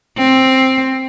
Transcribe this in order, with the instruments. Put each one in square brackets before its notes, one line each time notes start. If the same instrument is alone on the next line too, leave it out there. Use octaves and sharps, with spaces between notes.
[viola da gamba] C4